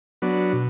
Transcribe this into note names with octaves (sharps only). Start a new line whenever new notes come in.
F#3 B3 D4
B2